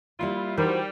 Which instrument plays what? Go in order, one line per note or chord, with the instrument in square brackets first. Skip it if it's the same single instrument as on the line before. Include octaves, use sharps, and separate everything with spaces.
[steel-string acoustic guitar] G3 A#3 D5 [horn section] E4 F4
[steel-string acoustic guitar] E3 F3 [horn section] G3 [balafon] D#4 A#4 [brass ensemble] F#4 C5